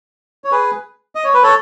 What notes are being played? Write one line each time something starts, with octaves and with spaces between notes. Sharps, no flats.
C#5
G#4 B4
D#5
C#5
B4
A4 C#5